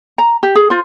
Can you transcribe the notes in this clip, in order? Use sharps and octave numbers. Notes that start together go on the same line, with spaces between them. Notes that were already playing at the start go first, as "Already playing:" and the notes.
A#5
G4
G#4
F4 C5